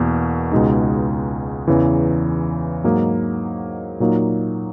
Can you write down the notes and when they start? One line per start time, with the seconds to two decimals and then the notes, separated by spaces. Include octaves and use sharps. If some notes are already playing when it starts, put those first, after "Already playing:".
Already playing: E2 B2 A#3
0.52 C#2 B2 G#3 D#4
1.68 E2 C#3 E3
2.84 G#2 F#3 A#3 D#4
4.00 A#2 F#3 A#3 D#4